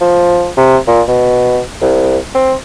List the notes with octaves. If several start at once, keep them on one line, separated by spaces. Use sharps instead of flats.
F3
C3
A#2
B2
C2
C4